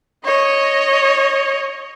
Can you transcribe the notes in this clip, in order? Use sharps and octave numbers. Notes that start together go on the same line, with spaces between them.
C#5 D#5